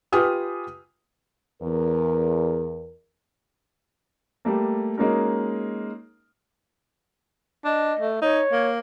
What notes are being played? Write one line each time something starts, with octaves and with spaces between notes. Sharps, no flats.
F4 G4 B4 G#5 D#6 F6
E2 A#4
G3 A3 A#3
G#3 A#3 C#4 D#4 F#4 A#4
D4 D#5
A3
D#4 C#5
A#3